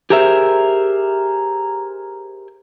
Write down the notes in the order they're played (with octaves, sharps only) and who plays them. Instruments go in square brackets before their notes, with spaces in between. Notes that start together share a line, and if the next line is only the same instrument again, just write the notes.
[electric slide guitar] G4 G#4 A#4 C5 E5